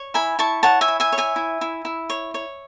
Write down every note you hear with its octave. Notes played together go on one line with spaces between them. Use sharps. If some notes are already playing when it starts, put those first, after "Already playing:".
Already playing: C#5
E4 G#5 B5
E4 A5 C#6
C#5 F#5 A5
E5 G#5
E4
E5 G#5
C#5
E5 G#5
E4
E4
E4
C#5
C#5